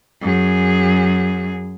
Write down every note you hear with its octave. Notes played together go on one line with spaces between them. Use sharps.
F#2 G#4